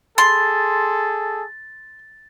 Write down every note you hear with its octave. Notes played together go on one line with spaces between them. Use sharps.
G#4 A4 C6 A6